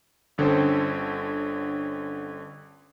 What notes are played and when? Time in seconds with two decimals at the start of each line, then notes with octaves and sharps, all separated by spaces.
0.38 G1 D3 C#4 A4 C5 G5